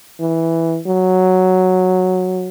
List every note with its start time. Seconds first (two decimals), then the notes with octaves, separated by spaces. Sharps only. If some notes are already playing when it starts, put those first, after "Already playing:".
0.20 E3
0.86 F#3